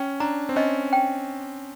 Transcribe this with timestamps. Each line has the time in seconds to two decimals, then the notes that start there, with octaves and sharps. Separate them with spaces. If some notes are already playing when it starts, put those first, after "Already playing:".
Already playing: C#4 G5
0.20 D4 A#5
0.49 C4
0.56 C#4 D#5
0.93 G5